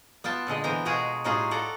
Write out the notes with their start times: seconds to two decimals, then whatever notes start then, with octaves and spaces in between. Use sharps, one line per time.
0.24 B3 F4 G5 A5
0.47 A#2 D3 G#3 D#5
0.64 E3 B3 C5 G5 A#5
0.85 B2 G#3 F4 F#4 G#4 A#5
1.24 A2 G3 D#4 F4 F#4 G#4
1.51 A4 D5 F#5 A#5